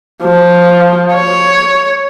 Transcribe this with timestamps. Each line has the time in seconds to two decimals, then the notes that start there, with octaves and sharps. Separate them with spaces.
0.23 F3
1.13 C#5